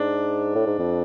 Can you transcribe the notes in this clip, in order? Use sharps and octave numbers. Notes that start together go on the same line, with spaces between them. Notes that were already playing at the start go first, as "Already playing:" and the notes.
Already playing: G#2 D4
A2
G#2
F2